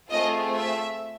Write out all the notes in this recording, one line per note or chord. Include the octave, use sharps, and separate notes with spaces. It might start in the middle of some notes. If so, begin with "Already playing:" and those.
A3 C4 F4 G#4 D#5
E5